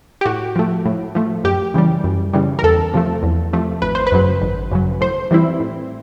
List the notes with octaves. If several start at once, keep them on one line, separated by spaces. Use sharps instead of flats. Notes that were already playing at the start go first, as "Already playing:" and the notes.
G4
A2 F#4
F3 A3
A2
F3 A3
F#2 G4
C#3 E3 G3
F#2
C#3 E3 G3
A#4
E2 A4
C3 F3 A3
E2
C3 F3 A3
G#1 B4
C5
B4
F#2 C#3 F#3
G#1
F#2 C#3 F#3
A2 C5
E3 G3 C4 E4
A2